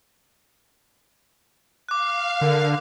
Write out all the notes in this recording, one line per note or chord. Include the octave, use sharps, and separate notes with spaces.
F5 D6 F#6
D3 A#4